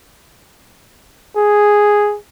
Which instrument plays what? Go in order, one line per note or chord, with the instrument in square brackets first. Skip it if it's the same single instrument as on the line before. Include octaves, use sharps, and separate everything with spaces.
[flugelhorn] G#4